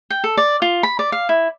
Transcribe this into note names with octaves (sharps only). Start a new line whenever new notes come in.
G5
A4
D5
F4
B5
D5
F5
E4